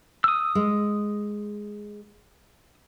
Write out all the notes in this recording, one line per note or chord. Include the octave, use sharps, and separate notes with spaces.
D#6 E6
G#3